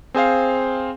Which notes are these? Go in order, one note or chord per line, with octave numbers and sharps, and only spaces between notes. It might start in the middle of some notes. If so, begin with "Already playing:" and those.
C4 G#4 C5 F5